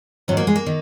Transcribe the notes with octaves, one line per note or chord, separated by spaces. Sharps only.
G#2 D#3 F#3 C#4
A#3
G#3
A#3
D#3